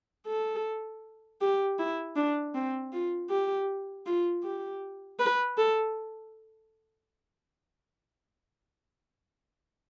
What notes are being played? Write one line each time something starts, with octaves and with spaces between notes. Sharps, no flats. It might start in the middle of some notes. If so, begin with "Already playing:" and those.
A4
G4
E4
D4
C4
F4
G4
F4
G4
B4
A4